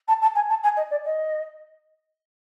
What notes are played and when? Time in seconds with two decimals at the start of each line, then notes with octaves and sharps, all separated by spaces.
0.08 A5
0.21 A5
0.35 G#5
0.49 A5
0.63 G#5
0.77 D#5
0.90 D5
1.05 D#5